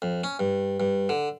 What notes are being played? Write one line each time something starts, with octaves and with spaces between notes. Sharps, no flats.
F2
C#4
G2
G2
D3